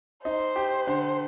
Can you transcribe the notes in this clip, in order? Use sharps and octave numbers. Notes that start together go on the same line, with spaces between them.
D#4 C5
G4
D3